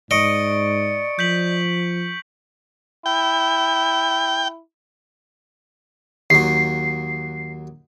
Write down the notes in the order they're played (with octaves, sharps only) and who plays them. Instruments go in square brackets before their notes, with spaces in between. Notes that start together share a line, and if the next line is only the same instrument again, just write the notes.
[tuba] G#2 [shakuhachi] D5 [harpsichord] D#5 [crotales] C#6 C#7 D7
[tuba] F3 [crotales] G6 B6 F#7
[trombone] E4 [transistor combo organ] G5
[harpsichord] D#2 F#3 [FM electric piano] C7